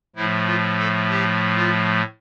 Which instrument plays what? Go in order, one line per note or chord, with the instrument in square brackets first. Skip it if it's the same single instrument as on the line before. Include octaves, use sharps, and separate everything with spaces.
[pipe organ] A2 F3 A3 E4
F4
A4
G4
F4